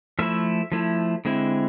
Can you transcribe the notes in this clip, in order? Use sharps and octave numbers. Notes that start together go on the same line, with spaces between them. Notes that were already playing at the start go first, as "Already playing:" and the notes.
F3 A3 E4 E5
F3 A3 E4
D3 G#3 C4 E4